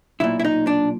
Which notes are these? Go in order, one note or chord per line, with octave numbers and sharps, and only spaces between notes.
B1 A#2 E4
E4
D#4
D4